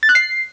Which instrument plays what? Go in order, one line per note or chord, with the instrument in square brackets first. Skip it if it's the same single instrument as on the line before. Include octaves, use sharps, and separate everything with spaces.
[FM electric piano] A6
F#6
C7